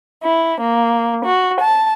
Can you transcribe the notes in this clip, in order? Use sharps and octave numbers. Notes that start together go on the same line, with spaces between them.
E4
A#3
F#4
A5